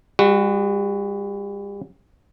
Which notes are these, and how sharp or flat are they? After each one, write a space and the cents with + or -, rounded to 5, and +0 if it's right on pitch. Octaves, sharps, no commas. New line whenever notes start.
G3 +40 F#4 +0